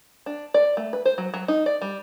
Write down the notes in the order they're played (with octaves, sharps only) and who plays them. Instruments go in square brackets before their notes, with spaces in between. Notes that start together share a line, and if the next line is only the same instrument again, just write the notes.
[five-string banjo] D4
D5
A3
B4
C5
F#3
F#3
D#4
D5
G3